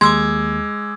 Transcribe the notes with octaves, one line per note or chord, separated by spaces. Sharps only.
D#2 G#3 C6 D6 E6 G#6